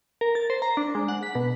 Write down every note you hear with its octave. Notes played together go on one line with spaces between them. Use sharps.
A#4
A6
C5
A#5
D4
G#3
F#5
B6
B2